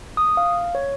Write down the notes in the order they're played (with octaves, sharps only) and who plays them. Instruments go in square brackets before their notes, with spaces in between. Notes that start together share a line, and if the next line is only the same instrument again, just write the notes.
[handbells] D#6
F5
C#5